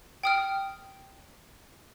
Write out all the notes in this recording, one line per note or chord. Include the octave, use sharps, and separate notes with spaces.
G5 D#6 F6